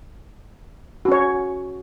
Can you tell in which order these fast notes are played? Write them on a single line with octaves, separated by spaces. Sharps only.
F#4 C#4 C#5